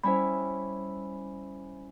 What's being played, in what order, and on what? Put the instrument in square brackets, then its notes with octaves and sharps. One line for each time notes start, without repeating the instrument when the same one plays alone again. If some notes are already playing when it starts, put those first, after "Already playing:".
[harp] G3 C#4 E4 [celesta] C5 B5